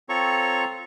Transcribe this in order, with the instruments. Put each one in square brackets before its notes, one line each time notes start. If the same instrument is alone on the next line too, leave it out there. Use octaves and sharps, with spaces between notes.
[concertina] C4 F4 A4 C#5 A#5 C#6